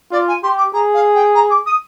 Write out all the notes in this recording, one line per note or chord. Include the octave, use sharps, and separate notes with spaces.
F4 D5
G#5
G4 C6
D6
G#4 A#5
F5
G5
A#5
D6
D#6